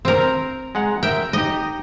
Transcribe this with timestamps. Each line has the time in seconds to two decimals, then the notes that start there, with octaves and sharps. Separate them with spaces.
0.05 C4 A#4
0.75 G#3 F#5 A#5
1.03 A#4 E5 G5
1.33 D#4 G4 D#5